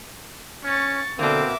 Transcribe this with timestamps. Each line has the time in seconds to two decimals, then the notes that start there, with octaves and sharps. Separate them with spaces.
0.65 C#4 C#6 A6
1.19 B2 D3 A#3 C4 E5 D6